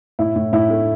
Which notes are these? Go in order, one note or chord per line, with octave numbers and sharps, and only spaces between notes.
A2 E4
A2
A2 E4
A3